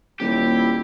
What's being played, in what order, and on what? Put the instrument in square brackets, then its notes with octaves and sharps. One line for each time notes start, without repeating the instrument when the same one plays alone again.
[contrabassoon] D#1 [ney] E4 [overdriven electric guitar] G4